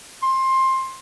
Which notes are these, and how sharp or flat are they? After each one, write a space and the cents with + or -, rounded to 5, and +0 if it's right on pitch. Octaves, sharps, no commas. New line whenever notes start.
C6 +20